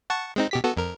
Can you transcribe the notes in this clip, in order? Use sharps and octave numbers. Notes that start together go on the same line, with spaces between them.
F#5 A5 C#6
G#3 C4 D#4
B2 G4 B6
B3 F#4 A4
F2 A#4